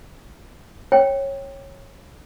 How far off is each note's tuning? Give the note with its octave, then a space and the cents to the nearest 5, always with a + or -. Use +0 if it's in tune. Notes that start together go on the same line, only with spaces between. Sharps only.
C#5 -15 G5 +0